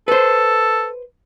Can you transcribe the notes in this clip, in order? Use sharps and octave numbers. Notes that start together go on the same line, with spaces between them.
A4 B4 C5